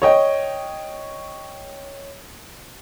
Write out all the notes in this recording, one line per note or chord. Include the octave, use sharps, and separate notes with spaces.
C#5 D#5 G5